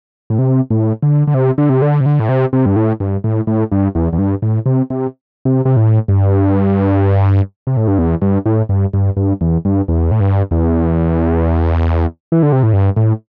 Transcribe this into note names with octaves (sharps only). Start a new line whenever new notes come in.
A2
C3
A2
D3
D3
C3
D3
C3
D3
C3
D3
A2
C3
C3
G2
A2
G2
A2
A2
G2
E2
E2
G2
A2
C3
C3
C3
C3
A2
G2
C3
A2
G2
E2
G2
A2
G2
G2
G2
E2
G2
E2
A2
G2
E2
E3
D3
C3
A2
G2
A2